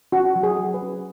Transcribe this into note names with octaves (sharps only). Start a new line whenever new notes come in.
C#4 F#4
F#3
G#4
F#3
B4
C#4